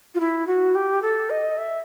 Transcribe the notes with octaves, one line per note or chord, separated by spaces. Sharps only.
F4
E4
F#4
G4
A4
D#5
E5